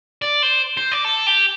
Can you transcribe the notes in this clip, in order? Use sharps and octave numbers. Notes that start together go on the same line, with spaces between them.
D5
C5
C5
D5
A4
G4